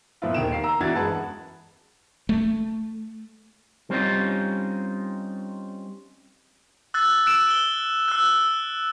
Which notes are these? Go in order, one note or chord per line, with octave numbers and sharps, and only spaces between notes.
A#2 F3 B3 E4 F4
D#1 D#3 D7 E7
A#3 F5 C7
A#5 E6
E2 E3 D4 F#4 G#6 A6
F#2 G#3 B4 F#5 A5
A3
G3 C4 C#4 D#4 F4
E6 F#6 A6
E6 F#6 D7 E7
G7
E6 F#6